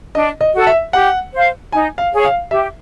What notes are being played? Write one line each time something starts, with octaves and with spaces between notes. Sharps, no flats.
D4 D#5
D#5
F#4 A4
E5
G4 F#5
C5 F5
D#4 G#5
F5
G#4 C#5
F5
G4 E5